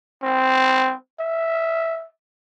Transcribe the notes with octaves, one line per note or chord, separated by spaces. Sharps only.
C4
E5